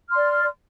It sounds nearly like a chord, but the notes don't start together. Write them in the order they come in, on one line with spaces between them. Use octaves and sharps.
F6 C6 D5